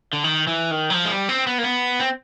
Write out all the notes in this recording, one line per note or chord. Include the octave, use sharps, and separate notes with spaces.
D3
D#3
E3
D#3
F#3
F3
G#3
G3
C4
B3
A#3
B3
C4